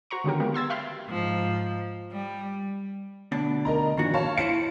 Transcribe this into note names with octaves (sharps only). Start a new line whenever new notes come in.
F#4 C5 A#5 C#6
D3 D#3 F#3 B3 G4 A#4
G#3 B3 F4 G4 A#4
C6 E6 G#6 A6
E5 F5 G5 B5 C6 F6
G#2 F3
G3
D2 B2 D4
A#4 D#5 A#5
G2 A#2 D#3 F3 F#4
C#5 F5 A5
E4 C5 F5 C#7